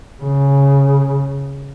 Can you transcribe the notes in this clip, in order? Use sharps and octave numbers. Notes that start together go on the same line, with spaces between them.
C#3